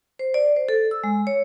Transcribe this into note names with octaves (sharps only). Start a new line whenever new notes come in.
C5
D5
C5
A4
E6
G#3
C#5